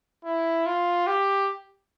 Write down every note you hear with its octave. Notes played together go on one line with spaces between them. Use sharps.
E4
F4
G4